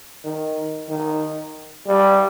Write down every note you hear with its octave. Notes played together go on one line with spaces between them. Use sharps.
D#3
D#3
G3